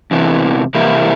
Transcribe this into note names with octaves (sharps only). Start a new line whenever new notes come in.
E2 C3 E3
C3 E3 A#3 E4 G4